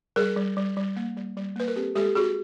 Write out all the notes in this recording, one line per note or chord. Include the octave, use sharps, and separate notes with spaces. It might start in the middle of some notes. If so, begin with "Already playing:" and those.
G3 G#4 A#4
G3
G3
G3
A#3
G3
G3
A#3 B4
A#4
C4 G4 A4
G#3 G4 A4
C4 F#4 G#4